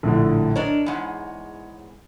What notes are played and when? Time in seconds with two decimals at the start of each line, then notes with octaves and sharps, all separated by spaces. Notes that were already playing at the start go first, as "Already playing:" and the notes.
0.03 A#1 A2 D3
0.56 D4 A#4 C#5 D#5
0.86 E2 G#2